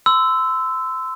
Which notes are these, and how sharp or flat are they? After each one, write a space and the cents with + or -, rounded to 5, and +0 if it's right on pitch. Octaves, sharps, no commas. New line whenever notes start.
C6 -30 E6 +0